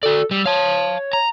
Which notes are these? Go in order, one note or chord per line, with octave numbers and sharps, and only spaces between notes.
F#4 A4 D5
G3 E6
C#5 F5 A5
A#5